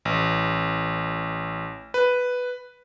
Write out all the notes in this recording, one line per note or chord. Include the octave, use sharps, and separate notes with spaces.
A1
B4